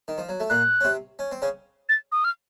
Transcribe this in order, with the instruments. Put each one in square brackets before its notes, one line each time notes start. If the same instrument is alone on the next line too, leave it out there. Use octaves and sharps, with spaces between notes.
[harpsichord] D#3
F3
F#3
A3
[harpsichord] A#2 A#3 [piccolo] F#6
[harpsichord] C#4
C3 C4
C#4
C4
C#3 C#4
[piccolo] A6
D#6
F6